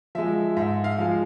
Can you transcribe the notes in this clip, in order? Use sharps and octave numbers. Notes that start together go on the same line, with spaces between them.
F3 G#3 E5
G#2 E5
F5
F3 G#3